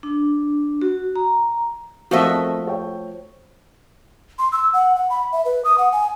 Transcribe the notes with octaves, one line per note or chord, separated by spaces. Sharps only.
D4
F#4
A#5
F3 A3 A#3 C4 F#4 D#5 E5
C#5 G5
C6
E6
F#5
F#5
B5
E5
B4
D#6
F#5
G#5